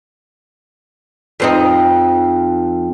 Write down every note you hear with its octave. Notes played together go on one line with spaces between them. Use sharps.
F2 C4 D#4